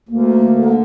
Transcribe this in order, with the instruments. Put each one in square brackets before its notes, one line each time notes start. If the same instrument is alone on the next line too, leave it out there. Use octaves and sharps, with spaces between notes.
[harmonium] D2 [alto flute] A#3
[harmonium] D3